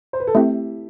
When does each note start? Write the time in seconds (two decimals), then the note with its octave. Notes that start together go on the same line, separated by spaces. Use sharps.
0.13 C5
0.20 B4
0.27 A4
0.35 A3 C4 E4 G4